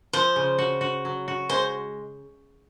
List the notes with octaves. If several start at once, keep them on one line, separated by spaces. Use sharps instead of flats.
F3 C5
C#3
F#4
F#4
F#3
F#4
G#3 C5